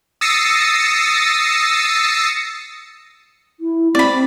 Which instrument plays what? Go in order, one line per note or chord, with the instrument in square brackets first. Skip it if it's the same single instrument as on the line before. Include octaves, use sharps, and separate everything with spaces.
[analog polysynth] D#6 E6 A6 A#6 C7 C#7
[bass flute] E4
[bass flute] C4 [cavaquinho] D5 B5